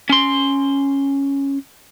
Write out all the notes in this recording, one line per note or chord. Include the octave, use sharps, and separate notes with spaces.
C#4 C6